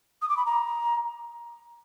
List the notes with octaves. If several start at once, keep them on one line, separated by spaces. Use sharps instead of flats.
D#6
D6
B5
A#5